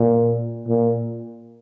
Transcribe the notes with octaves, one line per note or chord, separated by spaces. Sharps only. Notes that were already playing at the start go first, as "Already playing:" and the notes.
Already playing: A#2
A#2